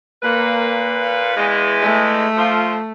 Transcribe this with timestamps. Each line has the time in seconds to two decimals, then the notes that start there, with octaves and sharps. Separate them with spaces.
0.23 A#2 A#3 B4
1.02 F5
1.36 E2 E3 G#3
1.81 A3
2.37 F3 F4